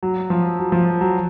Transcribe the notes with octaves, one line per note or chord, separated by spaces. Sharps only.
F#3
F3
F#3
F3
F#3